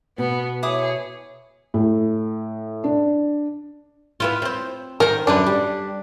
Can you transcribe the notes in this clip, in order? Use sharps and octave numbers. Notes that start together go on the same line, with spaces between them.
B2 B3
E4 G#4 C#5 D6 D#6
A2
D4
B3 E4 F4
C4 C5
D#3 A#4 C5
F#2 D3 D4 B4
G3